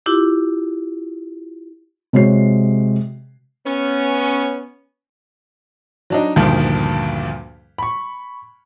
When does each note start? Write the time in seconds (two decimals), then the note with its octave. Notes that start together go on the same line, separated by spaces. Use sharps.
0.06 E4 F4 G4 D6
2.13 C3 G#3 F#4 C#5 C7
3.65 B3 C#4
6.10 F#3 D4 D#4
6.36 D2 G2 A#2 D#3 F3
7.78 B5 C#6